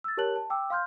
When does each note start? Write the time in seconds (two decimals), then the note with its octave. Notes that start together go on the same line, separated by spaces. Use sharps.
0.04 E6 A6
0.17 G4 A#4 C#5 A5 F#6 F#7
0.36 A5
0.50 G5 D6 E6
0.70 F5 C6 F6 G6